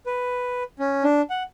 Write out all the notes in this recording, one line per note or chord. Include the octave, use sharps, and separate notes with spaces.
B4
C#4
D4
F#5